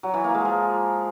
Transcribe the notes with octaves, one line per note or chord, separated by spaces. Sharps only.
F#3
E3
A#3
G#3
F3